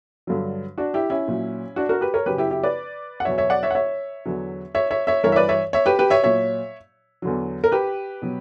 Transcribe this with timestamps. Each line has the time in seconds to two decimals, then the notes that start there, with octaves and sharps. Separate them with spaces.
0.27 G2 D3 F#3
0.78 D4 F#4
0.94 E4 G4
1.10 C#4 E4
1.28 A#2 F#3
1.76 D4 F#4
1.89 F#4 A#4
2.01 G4 B4
2.14 A#4 C#5
2.26 F#2 C#3 F#3 G4 B4
2.38 E4 G4
2.51 E4 G4
2.64 B4 D5
3.20 F#5
3.25 E2 B2 F#3 C#5 E5
3.38 C#5 E5
3.50 D5 F#5
3.63 C#5 E5
3.71 F#5
3.75 C#5 E5
4.26 E2 D3 F#3
4.75 C#5 E5
4.91 C#5 E5
5.07 C#5 E5
5.24 G2 E3 A#4 C#5
5.32 E5
5.36 B4 D5
5.49 C#5 E5
5.73 C#5 E5
5.86 G4 B4
5.99 G4 B4
6.10 C#5 E5
6.24 A#2 F#3 C#5 E5
7.22 E2 D3 F#3
7.64 A#4
7.72 G4 B4
8.22 B2 F#3